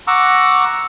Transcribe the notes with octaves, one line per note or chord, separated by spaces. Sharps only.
F#5 A#5 C#6 D6 E6